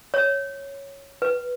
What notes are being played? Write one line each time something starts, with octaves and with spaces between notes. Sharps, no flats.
C#5
B4